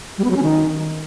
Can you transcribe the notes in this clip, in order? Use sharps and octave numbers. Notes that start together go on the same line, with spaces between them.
G3
B3
F#3
C#4
D#3